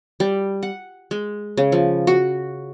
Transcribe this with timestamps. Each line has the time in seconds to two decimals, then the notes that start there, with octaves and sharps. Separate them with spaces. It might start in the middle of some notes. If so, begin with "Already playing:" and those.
0.20 G3
0.63 F#5
1.11 G#3
1.57 C#3
1.72 F3
2.07 F#4